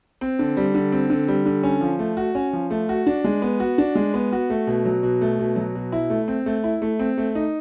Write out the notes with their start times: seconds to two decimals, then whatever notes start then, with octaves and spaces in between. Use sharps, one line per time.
0.21 C4
0.39 D3
0.57 G3
0.75 D3
0.92 C4
1.10 D3
1.28 G3
1.46 D3
1.63 C#4
1.81 F3
1.99 A3
2.17 F#4
2.35 C#4
2.53 F3
2.71 A3
2.89 F#4
3.07 D4
3.24 G#3
3.42 B3
3.60 F#4
3.78 D4
3.95 G#3
4.14 B3
4.32 F#4
4.50 A3
4.67 B2
4.85 F#3
5.03 B2
5.21 A3
5.39 B2
5.56 F#3
5.75 B2
5.92 E4
6.10 A3
6.28 C4
6.46 A3
6.64 E4
6.82 A3
6.99 C4
7.18 A3
7.35 D#4